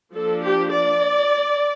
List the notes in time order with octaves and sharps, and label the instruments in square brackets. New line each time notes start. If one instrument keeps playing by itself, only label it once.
[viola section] F3 A#3 D4 A4
G4
D5